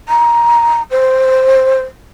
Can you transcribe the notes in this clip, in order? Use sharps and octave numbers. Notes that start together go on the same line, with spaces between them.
A#5
C5